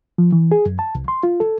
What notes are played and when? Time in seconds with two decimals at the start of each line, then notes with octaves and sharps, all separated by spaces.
0.18 F3
0.32 E3
0.52 G#4
0.66 F#2
0.79 A5
0.95 C2
1.08 C6
1.23 F4
1.40 A4